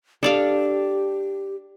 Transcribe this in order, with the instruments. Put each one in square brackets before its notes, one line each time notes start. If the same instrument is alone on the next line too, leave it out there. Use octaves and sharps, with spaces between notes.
[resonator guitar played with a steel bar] D4 [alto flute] G4 [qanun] A4 D5 F5